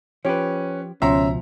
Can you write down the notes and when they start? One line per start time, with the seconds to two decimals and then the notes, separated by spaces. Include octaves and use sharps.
0.25 F3 C#4 G4 B4
1.02 C#2 B2 F3 C#4 E5 A#5 C6